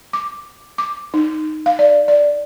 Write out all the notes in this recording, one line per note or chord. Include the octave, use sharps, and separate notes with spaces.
D6
D6
D#4
F5
D5
D5